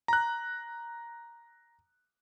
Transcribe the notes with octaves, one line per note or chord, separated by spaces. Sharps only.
A#5 F#6